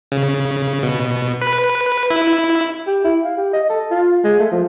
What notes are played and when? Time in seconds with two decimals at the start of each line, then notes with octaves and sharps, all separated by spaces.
0.12 C#3
0.83 B2
1.42 B4
2.11 E4
2.87 G4
3.04 E4
3.24 F5
3.37 G4
3.53 D#5
3.70 A4
3.91 F4
4.24 G#3
4.39 A3
4.51 F3